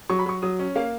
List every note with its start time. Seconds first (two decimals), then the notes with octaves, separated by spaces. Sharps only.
0.10 F#3 C#6
0.19 B5
0.26 F#3 C#6
0.42 F#3 D#6
0.59 C#4
0.76 A#3 F5